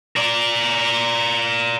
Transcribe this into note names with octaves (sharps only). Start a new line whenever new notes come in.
A#4 D5